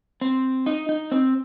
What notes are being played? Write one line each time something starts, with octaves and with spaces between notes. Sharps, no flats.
C4
D#4
D#4
C4